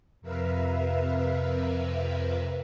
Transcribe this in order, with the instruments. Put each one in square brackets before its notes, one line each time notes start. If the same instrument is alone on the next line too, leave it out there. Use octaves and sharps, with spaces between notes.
[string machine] F2 C3 A#4 B4 E5 F5